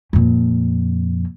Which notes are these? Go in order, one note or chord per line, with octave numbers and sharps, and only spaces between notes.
F2 A#2